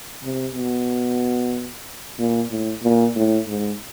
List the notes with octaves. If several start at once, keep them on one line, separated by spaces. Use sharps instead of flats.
C3
B2
A#2
A2
A#2
A2
G#2